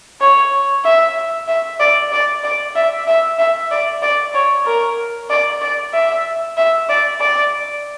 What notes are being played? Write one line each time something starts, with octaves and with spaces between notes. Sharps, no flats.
C#5
E5
E5
D5
D5
D5
E5
E5
E5
D5
D5
C#5
A#4
D5
D5
E5
E5
D5
D5